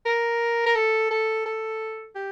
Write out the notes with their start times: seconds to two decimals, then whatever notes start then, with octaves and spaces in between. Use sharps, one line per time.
0.05 A#4
0.66 A#4
0.75 A4
1.10 A4
1.46 A4
2.15 G4